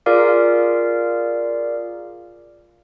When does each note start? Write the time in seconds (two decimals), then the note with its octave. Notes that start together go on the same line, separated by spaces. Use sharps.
0.06 F4 G#4 A#4 D5 F5 D6